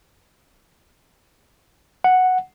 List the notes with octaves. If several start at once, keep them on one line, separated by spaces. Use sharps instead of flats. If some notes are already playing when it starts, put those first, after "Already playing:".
F#5